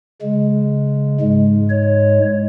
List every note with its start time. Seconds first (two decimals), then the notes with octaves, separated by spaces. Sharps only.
0.22 C#3 G#3
1.20 G#2 G#3
1.70 C#5